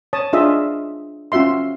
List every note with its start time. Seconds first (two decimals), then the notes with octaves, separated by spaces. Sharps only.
0.13 C#5 A5 D#6
0.33 D4 F4 G#4 D#5 E5
1.32 C#4 F4 F#4 E5 C6